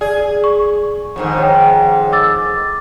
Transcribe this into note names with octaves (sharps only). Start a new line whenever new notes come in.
G#4 D5
C#6
F2 G#2 D#3
C#5 G5
D6 E6 A6